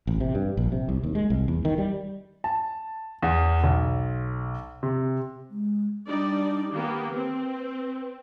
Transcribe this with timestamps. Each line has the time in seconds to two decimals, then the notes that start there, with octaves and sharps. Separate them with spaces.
0.07 A1
0.20 C3
0.35 G2
0.57 A#1
0.72 C3
0.89 C2
1.04 D#2
1.15 G#3
1.30 C2
1.48 E2
1.65 D#3
1.78 G3
2.44 A5
3.23 E2
3.64 B1
4.83 C3
5.50 G#3
6.07 G3 D4 D#4 D5
6.73 D#3 A#3 B3 G4
7.14 C4 B4